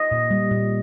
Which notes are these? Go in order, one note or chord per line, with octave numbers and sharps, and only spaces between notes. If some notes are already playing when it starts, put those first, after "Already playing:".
Already playing: D#5
A#2
G3
A#2